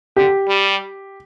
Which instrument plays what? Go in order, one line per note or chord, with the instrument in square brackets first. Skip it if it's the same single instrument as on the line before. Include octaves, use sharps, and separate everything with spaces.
[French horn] D3 [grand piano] G4
[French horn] G3